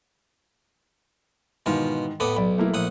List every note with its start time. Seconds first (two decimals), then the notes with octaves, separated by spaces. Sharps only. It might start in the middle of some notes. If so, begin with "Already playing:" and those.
1.66 G#2 B2 D#3 E3 F4
2.20 A2 B3 D6 D#6
2.37 B1 D5 B5
2.58 A3 A#3 E4
2.74 A#1 F#5 D#6